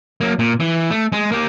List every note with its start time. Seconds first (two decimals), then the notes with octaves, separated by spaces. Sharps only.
0.21 F#3 A#3
0.39 A#2
0.60 E3
0.91 A3
1.12 G#3
1.32 A#3 G4